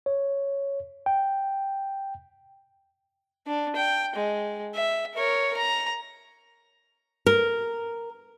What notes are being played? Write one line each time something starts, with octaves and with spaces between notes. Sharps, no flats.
C#5
G5
D4
G5
G#3
E5
A#4 C#5
A#5
A#4